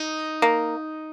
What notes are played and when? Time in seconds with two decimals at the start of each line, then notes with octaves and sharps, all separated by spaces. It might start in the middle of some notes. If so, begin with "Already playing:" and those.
Already playing: D#4
0.42 A#3